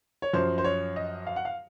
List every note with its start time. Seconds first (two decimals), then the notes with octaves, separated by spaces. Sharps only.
0.22 C#5
0.33 F#2 F3 C5
0.58 C5
0.64 C#5
0.96 D#5
1.27 F5
1.36 F#5
1.45 F5